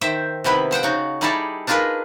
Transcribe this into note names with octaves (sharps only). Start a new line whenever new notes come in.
D#3 C5 E5 G5
C3 D#3 B3 E4 B4
F3 C5 F#5 G5
C#3 D#4 F#4
G3 D#4 E4 G#4 A4 D5
D4 D#4 F4 G#4 A#4 B4